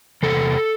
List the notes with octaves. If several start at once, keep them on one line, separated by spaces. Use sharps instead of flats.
E2 C3 A4